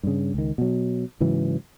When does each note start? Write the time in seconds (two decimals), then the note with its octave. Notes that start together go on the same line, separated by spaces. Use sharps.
0.03 G2 C#3
0.34 C#2 D#3
0.58 B2 F#3
1.20 G#2 C#3 E3 F#3